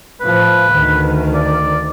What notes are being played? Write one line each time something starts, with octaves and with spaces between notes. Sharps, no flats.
A2 F3 B4
D2 D#3
D5